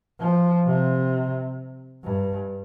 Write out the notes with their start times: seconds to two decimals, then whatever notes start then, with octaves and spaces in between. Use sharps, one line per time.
0.20 F3
0.66 C3
2.04 G2